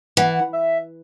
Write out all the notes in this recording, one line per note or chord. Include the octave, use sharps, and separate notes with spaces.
E3 F#5
E5